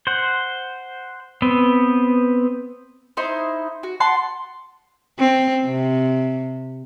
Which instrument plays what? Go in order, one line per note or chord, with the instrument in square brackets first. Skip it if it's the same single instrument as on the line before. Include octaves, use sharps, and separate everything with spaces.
[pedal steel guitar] C5 F#5
B3 C4
[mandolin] D#4 E4 C5
F#4
F#5 A5 C6
[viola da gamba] C4
C3